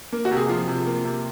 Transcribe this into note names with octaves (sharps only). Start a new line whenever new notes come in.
A#3
F#4
C3 G4
G#4
F3 F4
C3
A#3
C3